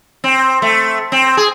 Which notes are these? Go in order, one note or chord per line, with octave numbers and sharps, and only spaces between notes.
C4
A3
C4
G#4